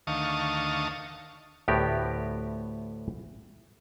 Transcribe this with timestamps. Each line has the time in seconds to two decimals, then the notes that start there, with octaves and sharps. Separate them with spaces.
0.07 D2 D#3 F5 A5 C#6 D#6
1.68 D2 A2 B3 G4 A#4